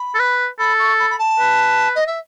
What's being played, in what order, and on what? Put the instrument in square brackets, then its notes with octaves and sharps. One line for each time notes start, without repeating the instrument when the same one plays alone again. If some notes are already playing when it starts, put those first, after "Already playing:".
Already playing: [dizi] B5
[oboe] A4
B4
[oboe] A4 [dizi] B5
[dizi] C#6
B5
B5
A5
[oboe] B4
[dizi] D#5
E5